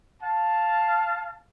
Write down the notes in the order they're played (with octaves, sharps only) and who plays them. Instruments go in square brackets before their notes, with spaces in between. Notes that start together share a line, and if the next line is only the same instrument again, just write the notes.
[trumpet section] F5 A5